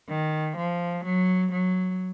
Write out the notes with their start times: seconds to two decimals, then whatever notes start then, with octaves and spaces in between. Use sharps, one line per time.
0.09 D#3
0.56 F3
1.05 F#3
1.52 F#3